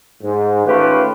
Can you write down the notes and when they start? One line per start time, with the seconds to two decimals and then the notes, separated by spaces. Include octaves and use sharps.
0.23 G#2
0.66 D#3 A3 C#4 F4 G4 B4